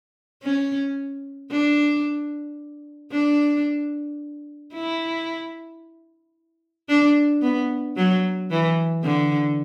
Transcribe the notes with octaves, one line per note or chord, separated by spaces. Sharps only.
C#4
D4
D4
E4
D4
B3
F#3
E3
D3